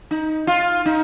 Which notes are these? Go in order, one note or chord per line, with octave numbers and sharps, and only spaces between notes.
D#4
F4
D#4